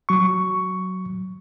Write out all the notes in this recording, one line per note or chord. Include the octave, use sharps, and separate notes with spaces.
F#3 C#6